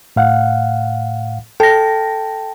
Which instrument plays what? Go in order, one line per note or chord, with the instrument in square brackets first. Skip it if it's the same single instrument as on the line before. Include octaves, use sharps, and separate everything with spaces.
[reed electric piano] A2 F5 F#5
[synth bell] A4 A#6 [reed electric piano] G5 A5